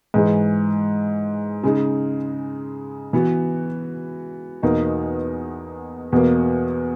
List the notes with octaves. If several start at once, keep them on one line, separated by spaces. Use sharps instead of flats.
G#2 E3 G#3
C#3 G#3 D#4
E3 B3 F#4
E2 B2 A#3 D#4
E2 B2 A#3